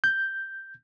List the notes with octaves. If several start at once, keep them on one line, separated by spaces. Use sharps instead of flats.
G6